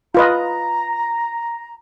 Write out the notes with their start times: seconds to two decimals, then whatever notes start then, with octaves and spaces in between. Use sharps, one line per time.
0.15 F4 B4 D#5 A#5